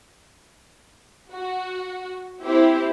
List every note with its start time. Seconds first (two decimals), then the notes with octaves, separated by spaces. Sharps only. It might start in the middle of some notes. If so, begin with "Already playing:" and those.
1.33 F#4
2.44 C4 E4 G4 C5